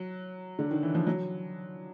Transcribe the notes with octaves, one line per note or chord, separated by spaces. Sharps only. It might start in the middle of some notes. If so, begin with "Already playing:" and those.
Already playing: F#3
D3
D#3
E3
F3
F#3